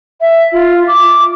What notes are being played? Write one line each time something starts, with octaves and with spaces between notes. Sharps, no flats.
E5
F4
D6